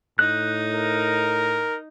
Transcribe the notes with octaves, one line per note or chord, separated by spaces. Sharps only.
A2 D#4 F#6
A#4